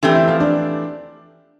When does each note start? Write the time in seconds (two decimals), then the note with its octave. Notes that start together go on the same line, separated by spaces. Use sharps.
0.03 E3 A3 C4 D4 G4
0.15 E4
0.28 F3 F4
0.40 D4 D5